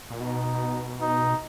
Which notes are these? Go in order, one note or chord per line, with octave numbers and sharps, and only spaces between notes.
A#2
B2 D#4
D#4